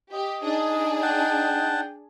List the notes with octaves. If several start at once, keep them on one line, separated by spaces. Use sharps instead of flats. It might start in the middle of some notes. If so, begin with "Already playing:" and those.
G4 D#5
D4 D#4 G#4
F#5 G5 A5